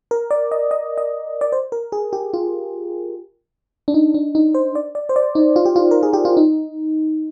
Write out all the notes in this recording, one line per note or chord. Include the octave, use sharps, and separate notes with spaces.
A#4
D5
D#5
D#5
D#5
D5
C5
A#4
G#4
G4
F4
D4
D#4
D4
D#4
C5
D5
D5
C5
D5
D#4
F4
G4
F4
A#4
G#4
G4
F4
D#4